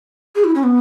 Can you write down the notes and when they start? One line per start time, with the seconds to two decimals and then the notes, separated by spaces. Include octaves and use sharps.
0.35 G#4
0.44 E4
0.55 C#4
0.64 B3